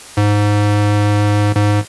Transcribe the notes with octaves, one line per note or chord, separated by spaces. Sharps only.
G#2
G#2